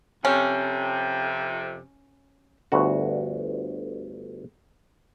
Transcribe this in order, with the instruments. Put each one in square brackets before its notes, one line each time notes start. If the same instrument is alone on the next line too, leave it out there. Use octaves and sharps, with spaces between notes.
[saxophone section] F2 C3 [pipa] C#4
[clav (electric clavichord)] G1 D2 F#4